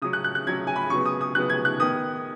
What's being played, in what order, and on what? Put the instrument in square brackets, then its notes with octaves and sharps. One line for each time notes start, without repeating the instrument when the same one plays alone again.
[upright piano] C#3 F#3 C#4 D#6
F#6
F#6
F#6
C#3 F#3 C#4 G#6
G#5
B5
C#3 F#3 B3 C#6
D#6
D#6
C#3 F#3 B3 F#6
G#6
F#6
D#3 B3 D#6